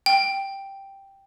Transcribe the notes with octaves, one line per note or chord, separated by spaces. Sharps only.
G5